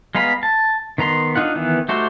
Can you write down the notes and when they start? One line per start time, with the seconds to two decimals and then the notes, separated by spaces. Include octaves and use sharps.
0.15 G#3 B3 F5 A#5 B5
0.43 A5
0.98 D#3 B3 A#5 C6
1.36 D4 D#4 F4 F#5
1.55 D#3 E3 B3
1.89 A3 D#4 F#4 G4 C5